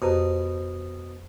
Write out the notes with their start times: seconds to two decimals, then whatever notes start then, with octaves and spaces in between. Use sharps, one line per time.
0.02 F2 B2 G4 A4 C5 A5 A#5